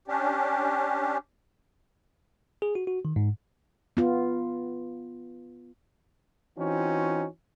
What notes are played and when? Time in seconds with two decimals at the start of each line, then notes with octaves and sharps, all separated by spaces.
0.08 C#4 D4 G4
2.62 G#4
2.75 F#4
2.87 F#4
3.05 D#3
3.16 G#2
3.97 B3 F4
6.58 E3 C4 C#4 D#4 F4 F#4